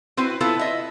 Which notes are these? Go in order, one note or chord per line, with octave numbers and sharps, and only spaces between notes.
C4 E4 F#4 B4 C5
B3 E4 F4 A4 B4
D#5 E5